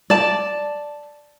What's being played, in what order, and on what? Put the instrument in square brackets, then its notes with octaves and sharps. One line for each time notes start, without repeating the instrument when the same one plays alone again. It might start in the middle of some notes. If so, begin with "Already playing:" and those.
[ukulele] D5 A5